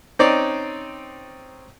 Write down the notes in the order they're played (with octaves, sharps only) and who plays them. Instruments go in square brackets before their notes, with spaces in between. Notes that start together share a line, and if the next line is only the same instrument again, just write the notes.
[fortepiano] C4 C#4 D#4 D5